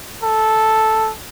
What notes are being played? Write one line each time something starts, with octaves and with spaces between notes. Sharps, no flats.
A4